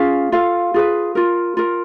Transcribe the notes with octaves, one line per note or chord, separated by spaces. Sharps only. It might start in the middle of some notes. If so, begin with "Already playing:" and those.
Already playing: C#4 F4 G#4 F5
F4 A4 F5
F4 G#4 B4
F4 A#4
F4 A#4